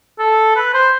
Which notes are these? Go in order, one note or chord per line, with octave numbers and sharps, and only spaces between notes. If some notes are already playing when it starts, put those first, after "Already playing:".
A4
B4
C5